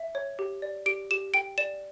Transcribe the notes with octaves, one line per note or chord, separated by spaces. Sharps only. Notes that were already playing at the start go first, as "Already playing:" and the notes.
Already playing: E5
C#5
G4
D5
G4 D7
G4 E7
G5 D7
D5 E7